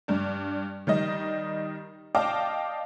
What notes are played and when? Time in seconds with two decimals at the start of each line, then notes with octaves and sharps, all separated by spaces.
0.08 G2 D4
0.87 D#3 G3 D#5
2.15 D5 D#5 F5 G5 A5 D6